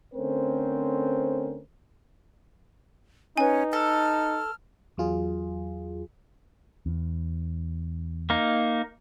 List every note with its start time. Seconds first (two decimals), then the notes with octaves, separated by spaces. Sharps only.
0.14 D3 A3 C4 C#4 A#4 C5
3.37 C#4 D#4 B4 G#5
3.73 A4 F6
4.97 E2 F#3 F4 G#4
6.86 E2
8.30 A#3 D#4